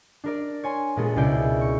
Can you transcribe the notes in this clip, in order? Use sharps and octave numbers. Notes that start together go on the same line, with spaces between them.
D4 A#4 D5
C#5 G#5 C6
A#2 G#3 B3 G#4 A4
C#2 B2 E4 G#4 D5 G6
C#6